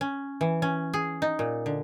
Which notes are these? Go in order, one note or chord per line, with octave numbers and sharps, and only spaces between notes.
C#4
E3
C#4
G#4
D#4
A#2
D3